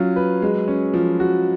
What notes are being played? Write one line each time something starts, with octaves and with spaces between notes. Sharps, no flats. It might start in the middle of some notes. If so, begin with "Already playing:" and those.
Already playing: F#3 C#4 F4
B4
G#3
C#4
F3
F#4